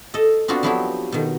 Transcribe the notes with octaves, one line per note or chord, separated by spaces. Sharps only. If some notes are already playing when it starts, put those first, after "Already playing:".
A4 D#5
B3 C4 D4 F4 F#4
F3 F#3 B3 E4 F#4 G4
B2 D#3